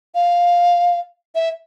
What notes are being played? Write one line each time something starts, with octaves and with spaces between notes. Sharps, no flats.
F5
E5